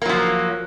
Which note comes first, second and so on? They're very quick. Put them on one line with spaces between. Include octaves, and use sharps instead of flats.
A#3 F#3 F3